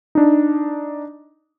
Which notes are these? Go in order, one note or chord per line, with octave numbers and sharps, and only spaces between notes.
D4 D#4